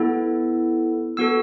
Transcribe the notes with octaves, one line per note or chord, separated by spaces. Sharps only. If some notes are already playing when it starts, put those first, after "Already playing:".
Already playing: B3 E4 A4
B3 F#4 A4 E6